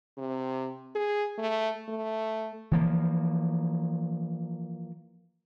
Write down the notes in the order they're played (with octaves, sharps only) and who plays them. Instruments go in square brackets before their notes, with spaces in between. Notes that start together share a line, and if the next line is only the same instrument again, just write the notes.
[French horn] C3
G#4
A3
A3
[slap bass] E3 F3 A#3